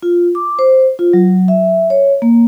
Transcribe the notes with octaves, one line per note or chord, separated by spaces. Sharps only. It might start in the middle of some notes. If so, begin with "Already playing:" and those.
F4
D6
C5
F4
F#3
E5
C#5
A#3